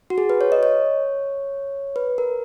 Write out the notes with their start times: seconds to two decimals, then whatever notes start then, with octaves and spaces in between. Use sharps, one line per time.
0.10 F#4
0.18 G#4
0.30 B4
0.41 C#5
0.52 D#5
0.63 C#5
1.96 B4
2.18 A#4